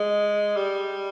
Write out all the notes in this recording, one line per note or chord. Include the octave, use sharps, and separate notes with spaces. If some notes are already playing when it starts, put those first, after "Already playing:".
Already playing: G#3
G3